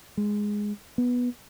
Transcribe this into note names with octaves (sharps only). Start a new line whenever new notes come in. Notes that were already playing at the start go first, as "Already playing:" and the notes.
G#3
B3